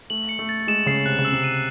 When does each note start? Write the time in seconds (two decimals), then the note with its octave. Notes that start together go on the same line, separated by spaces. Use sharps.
0.10 A3 F#7
0.29 C#7
0.39 A3
0.49 A6
0.67 G#3 E7
0.86 C#3 C7
1.05 C3 F#6
1.19 C#3
1.25 E6
1.32 C3
1.44 D#7